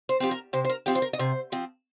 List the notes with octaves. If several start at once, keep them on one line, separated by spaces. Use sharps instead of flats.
C5
F3 C4 G4
A#4
C3 C5
C5
A#4
F3 C4 G4
C5
A#4
D#5
C3 C5
F3 C4